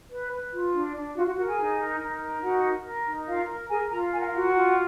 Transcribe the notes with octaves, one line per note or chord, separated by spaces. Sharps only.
B4
B4
F4
D4
D4
F4 F#4 F5
F#4 F#5
F#4 A#4 F#5
G#4 G#5
D#4
A#4
D#4
A#4
D#4 F#4 F#5
A#4
A#4
D#4
F4 A#4 F5
A#4
G#4 A#4 G#5
F4 A#4 A#5
A#4 G#5
F#5
F5
F4 F#4 F#5
F4